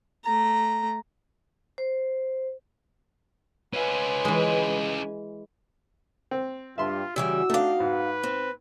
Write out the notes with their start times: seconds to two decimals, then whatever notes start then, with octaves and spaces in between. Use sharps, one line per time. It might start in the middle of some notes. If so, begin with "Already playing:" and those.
0.24 A3 A#5
1.78 C5
3.73 C#4 F4 B4 G#5
4.25 E3 G#3
6.31 C4
6.78 G2 F4 E5 C6
7.16 C#3 E3 G3 F#4 E6
7.50 A3 D4 D#4 F5
7.80 G#2 B4
8.23 C4